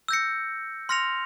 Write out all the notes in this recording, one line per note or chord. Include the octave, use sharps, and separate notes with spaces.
E6 G6 A#6 C#7
C6 F6 A#6 C#7 F7